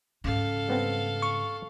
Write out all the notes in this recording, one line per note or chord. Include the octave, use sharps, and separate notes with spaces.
G#2 C#3 A4 F5
G3 B3 C4
C#6